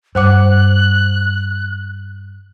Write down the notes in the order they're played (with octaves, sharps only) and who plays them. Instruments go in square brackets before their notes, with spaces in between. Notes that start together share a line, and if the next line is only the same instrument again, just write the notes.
[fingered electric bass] G2 [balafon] C5 F#5 D6 [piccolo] F#6